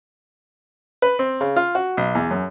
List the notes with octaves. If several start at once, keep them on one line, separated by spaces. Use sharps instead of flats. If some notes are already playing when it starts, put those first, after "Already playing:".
B4
C4
C#3
F4
F#4
B1
E2
F#2